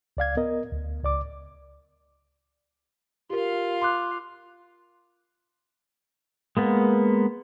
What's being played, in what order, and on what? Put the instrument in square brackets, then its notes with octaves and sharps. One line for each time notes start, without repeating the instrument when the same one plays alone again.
[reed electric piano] C#2 D5 F5 G#6
B3 A#4 D#5
D2
C#2 D5 D6
[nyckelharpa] F4 F5 [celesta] G4 A#4
[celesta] C6 D6 F#6
[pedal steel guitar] G#3 A#3 B3